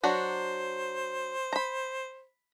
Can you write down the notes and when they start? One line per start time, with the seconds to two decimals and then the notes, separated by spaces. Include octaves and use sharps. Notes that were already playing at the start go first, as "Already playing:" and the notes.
0.04 F#3 D4 F#4 C5
1.53 A#5 B5